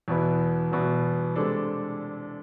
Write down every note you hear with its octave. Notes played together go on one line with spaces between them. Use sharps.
E2 B2 B3 E4
E2 B2 B3 E4
C3 G#3 D4 A4